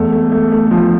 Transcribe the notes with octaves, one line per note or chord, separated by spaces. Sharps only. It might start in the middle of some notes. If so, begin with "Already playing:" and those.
Already playing: E2 A3
A3
A3
A3
F3